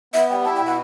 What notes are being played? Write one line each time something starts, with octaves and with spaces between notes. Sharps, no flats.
B3 E5
G3 G5
E4 A5
G5
B2
F#5